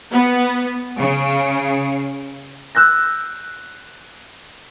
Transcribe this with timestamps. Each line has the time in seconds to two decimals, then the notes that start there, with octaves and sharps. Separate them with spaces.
0.12 B3
0.98 C#3
2.75 E6 F#6 G6 A#6